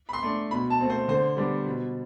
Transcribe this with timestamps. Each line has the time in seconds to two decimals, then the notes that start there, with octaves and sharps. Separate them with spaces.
0.09 B5
0.13 C6
0.23 A3 D4
0.51 B2 B5
0.70 A5
0.80 A3 C4
0.90 C5
1.08 D3 C5
1.37 G3 B3 D4
1.66 B2